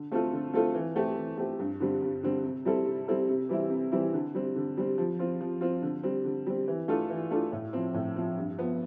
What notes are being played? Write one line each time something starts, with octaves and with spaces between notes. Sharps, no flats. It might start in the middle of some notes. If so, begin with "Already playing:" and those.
Already playing: D3
A3 C4 F4 A4
D3
A3 C4 F4 A4
E3
A3 C4 G4
E3
A3 C4 G4
G2
D3 G3 C4
G2
D3 G3 C4
C3
G3 C4 E4 A4
C3
G3 C4 E4 A4
C3
E3 G3 C4 E4
C3
E3 G3 C4 E4
D3
G3 C4
D3
G3 C4
F3
C4 F4
F3
C4 F4
D3
G3 C4
D3
G3 C4
E3
A3 D4 F4 A4
E3
A3 D4 F4 A4
A2
F3 C4
A2
F3 C4
G2
F3 B3